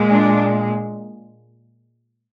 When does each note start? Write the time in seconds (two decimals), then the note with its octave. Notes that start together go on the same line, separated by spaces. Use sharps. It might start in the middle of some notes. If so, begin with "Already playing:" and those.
Already playing: A#2 G#3
0.09 D4